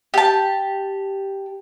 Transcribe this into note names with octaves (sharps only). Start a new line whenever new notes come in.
G4 A5